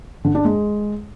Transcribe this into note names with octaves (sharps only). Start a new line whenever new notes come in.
D3
D4
G#3